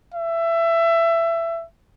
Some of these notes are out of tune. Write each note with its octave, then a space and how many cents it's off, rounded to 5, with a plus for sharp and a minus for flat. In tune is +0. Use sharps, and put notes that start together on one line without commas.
E5 +20